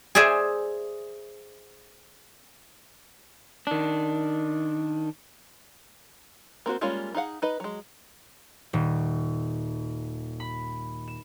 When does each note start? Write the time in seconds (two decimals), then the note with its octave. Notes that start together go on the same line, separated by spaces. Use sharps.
0.15 G#4 C5 D5 E5 G#5
3.67 D#3 D4
6.66 A#3 C4 F#4 C5
6.81 G3 G#3 A#3 C#4 F4
7.15 D#4 G#4 F5 F#5
7.42 D#4 B4 D#5
7.60 F#3 G#3
8.73 D#1
10.40 B5
11.08 E7